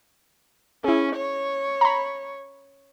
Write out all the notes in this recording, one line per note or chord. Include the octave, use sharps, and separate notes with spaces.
C#4 E4 G#4
C#5
A#5 B5